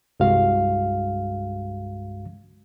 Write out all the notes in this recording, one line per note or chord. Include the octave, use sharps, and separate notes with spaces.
C2 G2 G#3 F#4 F5